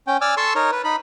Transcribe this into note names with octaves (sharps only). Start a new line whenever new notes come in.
C#4 G5
D5 G#5 D6 E6 F6
A4 A5 C6 C#6 E6
D#4 A#4 C#5
B4
D#4 B5